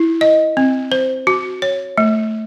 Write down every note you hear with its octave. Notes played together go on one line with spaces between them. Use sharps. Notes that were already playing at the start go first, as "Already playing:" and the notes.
Already playing: E4
D#5
C4
C5
F#4
C#5
A3